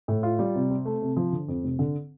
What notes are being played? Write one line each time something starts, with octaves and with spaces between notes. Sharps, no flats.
A2
F4
G3
C3
C4
A3
C3
F3
D3
F2
F1
D3